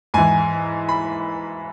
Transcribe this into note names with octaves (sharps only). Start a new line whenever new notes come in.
G#2 E3 G#5
B5